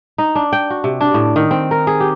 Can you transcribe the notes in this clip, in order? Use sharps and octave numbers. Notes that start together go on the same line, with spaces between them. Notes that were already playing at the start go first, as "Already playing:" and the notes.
D#4
D4
G5
F#4
C3
D4
A2
D#3
C4
A#4
G#4
G4